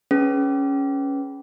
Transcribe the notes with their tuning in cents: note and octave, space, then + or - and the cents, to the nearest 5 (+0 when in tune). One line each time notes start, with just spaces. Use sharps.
C#4 +0 G#4 +15 B4 +0